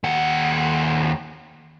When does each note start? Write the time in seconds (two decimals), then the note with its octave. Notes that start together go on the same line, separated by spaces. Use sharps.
0.04 D#2 F#5